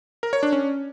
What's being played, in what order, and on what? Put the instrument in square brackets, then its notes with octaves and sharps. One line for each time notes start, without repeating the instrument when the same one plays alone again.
[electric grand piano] A#4
C#5
D4
C#4